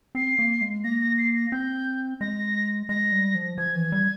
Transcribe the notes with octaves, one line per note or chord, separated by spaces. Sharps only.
C4 C7
A#3
G#3
A#3 A#6
A#6
C7
A#6
C4 G6
G#3 A#6
G#3 A#6
G3
F3
F3 G#6
E3
G3